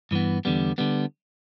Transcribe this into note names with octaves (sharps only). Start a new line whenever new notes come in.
G2 E3 B3
E2 D3 G3 B3
D3 G3 B3